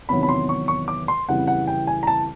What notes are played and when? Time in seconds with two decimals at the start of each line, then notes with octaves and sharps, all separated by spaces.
0.09 E2 C3 D#3 F#3 B5
0.23 B5
0.29 C6
0.49 C#6
0.68 C#6
0.88 D6
1.08 C6
1.28 F2 C#3 E3 G3 F#5
1.47 F#5
1.67 G5
1.87 G#5
2.03 A#5
2.07 A5